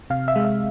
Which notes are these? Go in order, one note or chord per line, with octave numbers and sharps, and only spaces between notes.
C3 F5
E5
G#3
E5